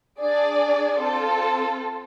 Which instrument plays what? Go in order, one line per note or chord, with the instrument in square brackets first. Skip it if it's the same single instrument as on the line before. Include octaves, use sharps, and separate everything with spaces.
[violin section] D4 G#4 D5
C4 F4 A4